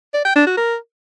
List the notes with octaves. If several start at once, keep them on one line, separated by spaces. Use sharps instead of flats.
D5
G5
D4
F#4
A#4